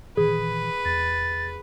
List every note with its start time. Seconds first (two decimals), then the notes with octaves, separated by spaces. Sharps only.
0.17 A#2 D#3 E3 G#4 B4
0.85 E2 A6